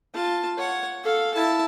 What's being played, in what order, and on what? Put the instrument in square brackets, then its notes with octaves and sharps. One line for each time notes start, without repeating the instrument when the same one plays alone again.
[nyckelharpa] F4 A5
C#5 F#5
A4 F5
E4 A5